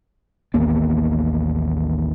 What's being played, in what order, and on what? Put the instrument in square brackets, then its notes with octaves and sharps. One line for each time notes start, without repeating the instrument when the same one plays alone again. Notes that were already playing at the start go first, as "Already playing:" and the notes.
[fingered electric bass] A1 D#2 A#3 B3